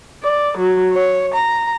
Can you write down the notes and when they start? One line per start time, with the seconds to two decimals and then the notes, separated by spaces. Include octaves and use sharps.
0.24 D5
0.57 F#3
0.92 C#5
1.34 A#5